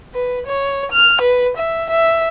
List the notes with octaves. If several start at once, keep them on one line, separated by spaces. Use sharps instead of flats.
B4
C#5
F6
B4
E5
E5